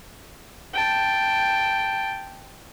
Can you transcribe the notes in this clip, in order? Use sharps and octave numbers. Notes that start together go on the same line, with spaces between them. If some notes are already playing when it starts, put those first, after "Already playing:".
G5 A5